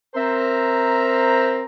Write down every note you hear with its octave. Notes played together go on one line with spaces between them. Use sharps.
C4 A#4 C5 E5 A#5